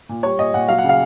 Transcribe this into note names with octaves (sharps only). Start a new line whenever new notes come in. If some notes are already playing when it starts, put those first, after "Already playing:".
A#2
G3 C#5
A#2 D#5
A#2 F#5
F#3 F5
F#5
C#3
F5